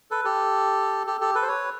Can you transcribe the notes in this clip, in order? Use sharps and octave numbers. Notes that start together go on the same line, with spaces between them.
A4 B4
G4 A4
G4 A4
G4 A4
A4 B4
C5
B4 C#5